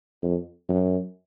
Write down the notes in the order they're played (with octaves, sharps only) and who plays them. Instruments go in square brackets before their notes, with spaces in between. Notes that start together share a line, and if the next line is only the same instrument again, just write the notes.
[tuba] F2
F#2